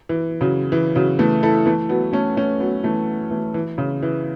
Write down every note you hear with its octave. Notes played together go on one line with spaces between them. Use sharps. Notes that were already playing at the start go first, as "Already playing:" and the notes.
E3
C#3 F#3
E3
C#3 F#3
E3 A3
E4 A4
E3 A3
F#3 B3
A3 C#4
A3 C#4
F#3 B3
E3 A3
E3 A3
E3
C#3
E3